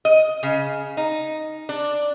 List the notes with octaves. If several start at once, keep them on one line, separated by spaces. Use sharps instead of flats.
D#5
C#3
D#4
D4